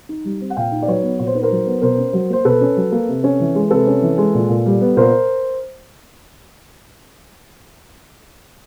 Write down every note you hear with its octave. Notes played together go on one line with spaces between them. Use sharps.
D#4
G3
C4
F#5
A#2 F5 G5
D#4
D5
F#3 B4 C#5
B3
A#2 C#5
C5
D#4 B4
A#4 C5
F#3
B3
B2 A#4 C5
C#4
F#3
A#3 C5
B2 A4 B4
C#4
F#3
A#3
C3
C#4
E3
G#3
C3 A4 B4
C#4
E3
G#3
A#2
A#2
G3
B3
A#2 A#4 C5